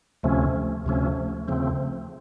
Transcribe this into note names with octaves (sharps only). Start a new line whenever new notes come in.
D2 C3 F3 A3 C#4
D2 C3 F3 A3 C#4
D#2 C#3 F3 A3 C4